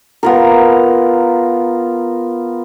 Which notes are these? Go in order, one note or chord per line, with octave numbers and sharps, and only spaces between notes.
B3 F4 A#4